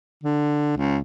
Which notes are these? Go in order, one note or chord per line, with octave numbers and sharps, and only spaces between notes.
D3
C#2